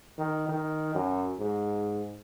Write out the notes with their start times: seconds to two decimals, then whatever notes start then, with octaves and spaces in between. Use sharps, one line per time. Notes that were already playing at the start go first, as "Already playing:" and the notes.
0.18 D#3
0.48 D#3
0.95 F#2
1.39 G#2